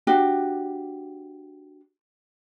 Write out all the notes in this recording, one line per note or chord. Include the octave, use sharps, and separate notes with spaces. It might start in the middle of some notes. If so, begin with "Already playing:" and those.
D4 F#4 G4